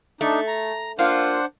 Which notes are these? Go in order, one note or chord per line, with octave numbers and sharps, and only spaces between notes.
A3 D4 D#4
A#5
A#3 D4 F4 C5 F#5